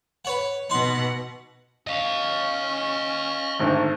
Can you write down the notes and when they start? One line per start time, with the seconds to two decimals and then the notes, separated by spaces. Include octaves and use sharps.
0.25 B4 C#5 F#5
0.70 B2 D#4 F#5 C6
1.87 C#4 D#5 F5
3.60 G#1 G#2 D3 A3